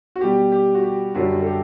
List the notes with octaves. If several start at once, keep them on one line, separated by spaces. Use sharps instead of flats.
F#4
B2 G3 G4
G4
F#4
G4
F#2 D3 G3 F#4
A4
G4